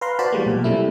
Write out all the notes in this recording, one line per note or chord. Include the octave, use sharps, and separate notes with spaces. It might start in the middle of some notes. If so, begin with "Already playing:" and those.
B4 F5 A#5 C6
F#4 B4 C5 D5 A5 B5
E3 G3 G#3 A#3
B1 A#2
C3 G3 A3 E4